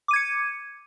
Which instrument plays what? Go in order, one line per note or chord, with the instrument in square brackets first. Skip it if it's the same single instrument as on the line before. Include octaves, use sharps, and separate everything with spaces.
[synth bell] D6
D#7
G#6
C#7